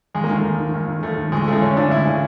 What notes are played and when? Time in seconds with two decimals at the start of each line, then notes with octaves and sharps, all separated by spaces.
0.15 D#2 G#3
0.24 A#3
0.29 D#3 A3
0.44 D#2
0.59 D#3
0.74 D#2
0.88 D#3
1.03 D#2 A3
1.17 D#3
1.32 D2 G#3
1.48 C#3 A3
1.51 E3 G#3
1.62 D2 C#4
1.76 C#3 E3 D4
1.91 D2 E4
2.06 C#3 E3